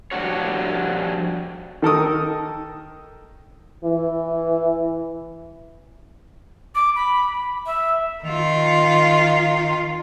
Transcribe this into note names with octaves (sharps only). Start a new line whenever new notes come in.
F3 G3 D4 F#4 C#5
D#3 A4 A#4 D#6
E3
D6
B5
E5
D#3 F4